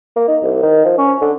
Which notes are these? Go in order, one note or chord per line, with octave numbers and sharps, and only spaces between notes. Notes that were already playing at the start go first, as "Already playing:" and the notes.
A#3
D#4
C2
D#3
F3
C#4
D3